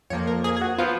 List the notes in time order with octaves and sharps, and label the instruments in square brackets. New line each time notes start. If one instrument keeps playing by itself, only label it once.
[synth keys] F2 F3 A#3 C#5
A#4
G#4
G#4
F#4
F3 B3 F4